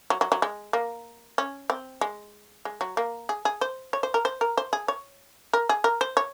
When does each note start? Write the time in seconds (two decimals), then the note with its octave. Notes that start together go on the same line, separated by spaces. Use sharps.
0.10 F#3
0.21 F#3
0.32 F#3
0.42 G#3
0.73 A#3
1.38 C#4
1.70 C4
2.01 G#3
2.65 G#3
2.81 F#3
2.97 A#3
3.29 G#4
3.45 G#4
3.61 C5
3.93 C#5
4.03 C5
4.14 A#4
4.25 C5
4.41 A#4
4.57 C5
4.73 G#4
4.88 C#5
5.53 A#4
5.69 G#4
5.84 A#4
6.01 C5
6.17 C#5